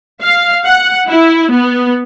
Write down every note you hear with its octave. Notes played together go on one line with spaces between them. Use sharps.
F5
F#5
E4
B3